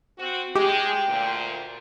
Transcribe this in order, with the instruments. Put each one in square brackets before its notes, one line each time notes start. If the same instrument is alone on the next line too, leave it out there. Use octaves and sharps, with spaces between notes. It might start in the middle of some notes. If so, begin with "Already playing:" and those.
[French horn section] C4 F#4
[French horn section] G#3 [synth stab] G4 [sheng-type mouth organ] G5
[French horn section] D2 A#2